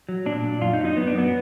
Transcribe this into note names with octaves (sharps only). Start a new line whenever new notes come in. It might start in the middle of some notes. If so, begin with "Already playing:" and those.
F#3
A#2 D4
A#2
F#2 F4
D#4
F#3
D#4
F#2 B3
D4
F#3 B3